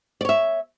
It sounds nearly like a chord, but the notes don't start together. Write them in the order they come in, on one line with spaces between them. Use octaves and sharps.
D5 C#5 E5